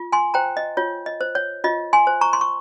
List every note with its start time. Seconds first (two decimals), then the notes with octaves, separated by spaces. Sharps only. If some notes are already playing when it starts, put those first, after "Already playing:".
Already playing: F4
0.12 G#5 C6
0.34 C5 G5 A#5
0.57 D#5
0.77 F4 C#5
1.06 D#5
1.21 C5
1.35 C#5
1.64 F4 D#5
1.93 G#5 C6
2.07 C5
2.21 A#5 C#6
2.33 C6
2.41 C#6